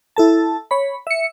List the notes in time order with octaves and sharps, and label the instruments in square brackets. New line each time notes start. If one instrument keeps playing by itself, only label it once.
[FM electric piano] E4 A4 A5
C#5 B5
E5 C#7